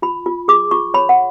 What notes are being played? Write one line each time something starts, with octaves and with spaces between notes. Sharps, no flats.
F4 B5
F4
G#4 D6
F4 C#6
C#5 B5
F#5